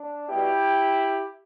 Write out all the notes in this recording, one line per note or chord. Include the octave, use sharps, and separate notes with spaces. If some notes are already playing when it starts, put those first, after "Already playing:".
Already playing: D4
B2 G3 B3 E4 G4